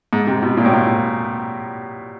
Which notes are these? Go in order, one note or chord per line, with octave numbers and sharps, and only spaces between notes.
G#2
C3
B2
A#2
A2
A#2